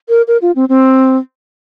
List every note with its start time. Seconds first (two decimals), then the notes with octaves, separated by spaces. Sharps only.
0.09 A#4
0.28 A#4
0.42 F4
0.56 C4
0.69 C4